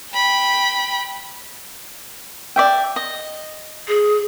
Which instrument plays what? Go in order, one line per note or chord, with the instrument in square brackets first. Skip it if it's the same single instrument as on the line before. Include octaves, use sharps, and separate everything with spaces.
[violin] G5 B5
[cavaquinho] D5 E5 G5
D#5
[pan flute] G#4